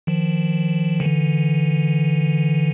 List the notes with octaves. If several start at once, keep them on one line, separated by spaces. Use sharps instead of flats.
D#3 F3
D3 E3